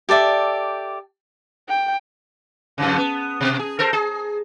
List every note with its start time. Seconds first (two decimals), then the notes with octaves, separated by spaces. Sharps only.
0.09 G4 A4 D5 E5
1.69 G5
2.78 F2 G#2 C#3
2.98 B3
3.41 B2
3.59 G#4
3.79 A4 A#4 C5
3.93 G#4